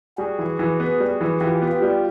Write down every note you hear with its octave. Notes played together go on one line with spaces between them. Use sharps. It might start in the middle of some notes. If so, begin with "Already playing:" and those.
G3 F#4 G#4
E3
E3
B3
G3
E3
E3 F4 G4
B3
F4 G4
G3